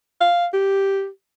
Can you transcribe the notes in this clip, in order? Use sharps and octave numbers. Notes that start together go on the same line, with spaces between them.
F5
G4